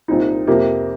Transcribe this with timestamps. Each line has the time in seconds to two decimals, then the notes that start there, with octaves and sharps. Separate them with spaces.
0.08 C2 A#2 G3 C4 D#4
0.47 F2 C3 F3 A#3 G4